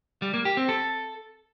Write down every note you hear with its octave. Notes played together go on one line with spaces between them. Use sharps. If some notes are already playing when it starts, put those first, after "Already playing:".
G3
A#3
G4
C4
A4